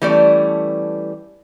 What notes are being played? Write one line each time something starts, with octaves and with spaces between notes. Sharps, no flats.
E3 G3 A3 C#4 D5